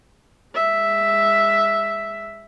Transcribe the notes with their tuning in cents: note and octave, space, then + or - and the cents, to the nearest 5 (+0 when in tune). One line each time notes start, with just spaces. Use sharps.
G#3 -25 E5 +0